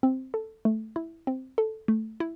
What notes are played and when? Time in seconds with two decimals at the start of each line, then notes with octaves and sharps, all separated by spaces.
0.03 C4
0.34 A4
0.65 A3
0.96 E4
1.27 C4
1.58 A4
1.88 A3
2.20 E4